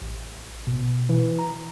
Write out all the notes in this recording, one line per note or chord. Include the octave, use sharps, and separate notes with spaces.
A1
B2
E3
A#5